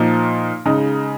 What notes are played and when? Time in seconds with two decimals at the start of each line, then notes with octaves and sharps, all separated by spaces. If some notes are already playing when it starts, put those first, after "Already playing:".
Already playing: A#2 F3 A#3 D#4
0.65 C#3 G#3 D#4